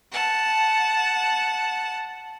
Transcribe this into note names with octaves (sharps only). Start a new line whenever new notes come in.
F#5 A5